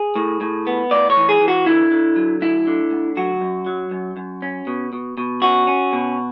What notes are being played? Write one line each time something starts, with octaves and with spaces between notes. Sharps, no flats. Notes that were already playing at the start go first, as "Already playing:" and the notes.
Already playing: G#4
A2
A2
B3
A2 D5
C#5
E3
G#4
E3
F#4
D3 E4
D3
F#3
D2 E4
D3
D2
F#3 F#4
F#2
F#3
F#2
F#2
C#4
B2
B2
B2
C#4 F#4
C#4
B2